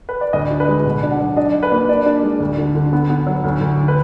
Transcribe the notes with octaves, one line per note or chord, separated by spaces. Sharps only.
B4
D5
D2 D#5
D4
B4
G#3
B2
D4
F#5
F#3
D4 D#5
D4
B4
A#3
D4 D5
D4
G#3
D2
D3
D3
B3
B3
F#3
D2
D2
B4